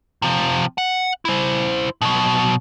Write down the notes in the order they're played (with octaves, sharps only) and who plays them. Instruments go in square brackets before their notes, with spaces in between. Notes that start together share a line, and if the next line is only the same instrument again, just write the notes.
[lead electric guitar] C3 F3
F#5
E4 C5
B2 F#3